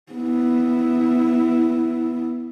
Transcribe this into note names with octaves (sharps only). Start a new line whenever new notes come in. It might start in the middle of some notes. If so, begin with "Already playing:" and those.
B3 E4